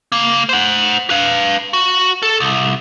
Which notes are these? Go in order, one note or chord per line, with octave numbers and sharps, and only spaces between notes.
C#3 A#3
C5 F#5
B4 F5
F#4
A4
C2